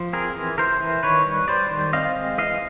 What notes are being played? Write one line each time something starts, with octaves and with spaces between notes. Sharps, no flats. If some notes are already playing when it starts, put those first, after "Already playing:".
Already playing: F3
C4 G#4 A#4
E3
E3 A#4 C5
E3
D#3 B4 C#5
G3
G3 C5 D5
D#3
C4 D#5 F5
G#3
E3 D#5 F5